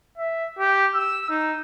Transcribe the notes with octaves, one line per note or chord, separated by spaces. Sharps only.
E5
G4
E6
D#4